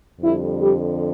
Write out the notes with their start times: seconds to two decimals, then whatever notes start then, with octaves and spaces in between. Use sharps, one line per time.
0.20 F2 D3 G3 E4
0.60 G3 G4